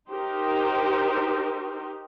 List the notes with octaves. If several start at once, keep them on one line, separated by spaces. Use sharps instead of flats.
D#4 G4 A#4 C5